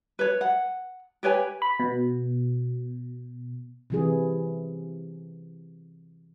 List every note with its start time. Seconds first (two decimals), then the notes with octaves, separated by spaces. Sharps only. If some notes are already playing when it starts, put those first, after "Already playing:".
0.19 B4 C#5
0.41 F#5
1.23 G4 B4 C#5 G#5
1.62 B5
1.80 B2
3.90 C3 E3 G#4